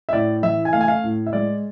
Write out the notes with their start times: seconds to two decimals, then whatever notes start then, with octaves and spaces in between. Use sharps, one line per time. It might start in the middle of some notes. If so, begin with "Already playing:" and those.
0.09 E5
0.12 A2 D5
0.43 E3 E5
0.65 G#5
0.73 A3 F5
0.81 G#5
0.88 F5
1.04 A2
1.27 E5
1.33 G#3 D5